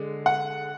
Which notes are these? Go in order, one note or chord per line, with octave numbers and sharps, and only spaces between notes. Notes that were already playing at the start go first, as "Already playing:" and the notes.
Already playing: D3 G#3
F#5